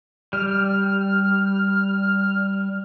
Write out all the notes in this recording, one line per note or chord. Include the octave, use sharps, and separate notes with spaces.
G3 F6